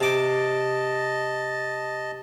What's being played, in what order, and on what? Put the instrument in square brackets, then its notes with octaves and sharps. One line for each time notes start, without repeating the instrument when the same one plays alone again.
[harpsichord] C3 D6 [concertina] D#5 A5